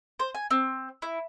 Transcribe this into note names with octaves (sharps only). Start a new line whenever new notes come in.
C5
G#5
C4
E4